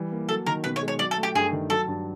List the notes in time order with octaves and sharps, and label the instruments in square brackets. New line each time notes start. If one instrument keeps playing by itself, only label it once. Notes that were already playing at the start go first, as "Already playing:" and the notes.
Already playing: [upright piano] E3 G3
A#3
[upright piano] F#3 [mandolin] A4
[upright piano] D#3 [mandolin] A#4
[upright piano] B2 [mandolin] B4
[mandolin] C#5
[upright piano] G#3
[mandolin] C#5
[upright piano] F#3 [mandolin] D5
[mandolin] A4
[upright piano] A3
[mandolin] G4
[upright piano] G2 [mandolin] G#4
[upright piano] D#3
[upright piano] F#3 [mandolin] A4
[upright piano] G2